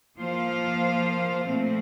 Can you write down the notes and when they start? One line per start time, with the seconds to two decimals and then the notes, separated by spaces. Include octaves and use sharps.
0.18 F3 A#3 F4 C5 F5
1.46 A#2 F3 A3 C4